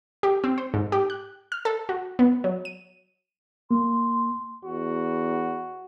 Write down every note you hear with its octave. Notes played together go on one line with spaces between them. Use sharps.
G4
C4
C5
G#2
G4
F#6
F6
A4
F#4
B3
F#3
D#7
A#3 C6
E2 F#4